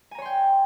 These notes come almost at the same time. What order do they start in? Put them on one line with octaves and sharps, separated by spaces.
G#5 A#5 C#5 C6 G5